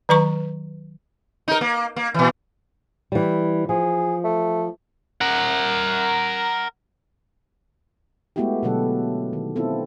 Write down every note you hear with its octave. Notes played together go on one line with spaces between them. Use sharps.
D#3 F#3 B4 A#5 C#6
D#4 A#4
A#3
A#3
A#2 E3
E3 G3
F3 G#4
A3
A#4 F#5
G#3 A3 B3 E4 F#4 G4
B2 D3 F#3 A3 A4 F#5
D#3
B3 C4 E4 F4 A4